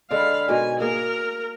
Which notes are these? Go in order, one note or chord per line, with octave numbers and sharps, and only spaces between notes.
D3 G#3 D5 F5 B5
G#2 B2 A#4 G#5
A#3 G#4 A#4